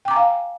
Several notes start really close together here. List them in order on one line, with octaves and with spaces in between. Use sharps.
G5 D6 A#5 G#5 F5